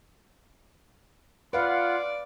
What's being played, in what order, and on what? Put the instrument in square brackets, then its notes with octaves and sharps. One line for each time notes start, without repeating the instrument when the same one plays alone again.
[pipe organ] F4 F#5 [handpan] B4 F5 [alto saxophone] D5